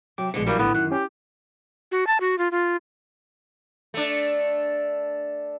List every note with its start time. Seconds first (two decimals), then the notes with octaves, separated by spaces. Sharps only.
0.18 C3 F#3 G5 D6
0.34 A#1 B2 D3 G#3 C#7
0.46 E3 F#3 G3 A#3
0.59 A2 D3 B3
0.74 F#2 D#3 F#5
0.92 C#4 G4
1.92 F#4
2.07 A5
2.20 F#4
2.38 F4
2.51 F4
3.94 A3 D4